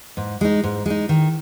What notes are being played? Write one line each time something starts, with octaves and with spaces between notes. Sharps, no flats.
G#2
G#3 D#4
G#2
G#3 D#4
D#3